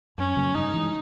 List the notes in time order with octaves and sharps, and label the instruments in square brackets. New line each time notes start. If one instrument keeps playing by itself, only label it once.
[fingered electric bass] F#2 [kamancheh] C#4
[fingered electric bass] C#3 F#3 A#3
[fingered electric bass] G2 [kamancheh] D#4
[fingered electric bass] E3 G#3